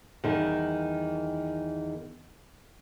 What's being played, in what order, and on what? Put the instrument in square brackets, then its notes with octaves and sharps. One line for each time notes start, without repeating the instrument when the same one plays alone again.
[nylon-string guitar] E2 D#3 G3